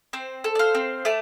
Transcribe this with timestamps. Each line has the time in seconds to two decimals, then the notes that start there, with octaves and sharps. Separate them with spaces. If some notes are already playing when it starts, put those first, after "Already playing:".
0.13 C4 C5
0.44 A4
0.55 D5
0.59 C5 F5
0.75 C4
1.05 A3 A5 D6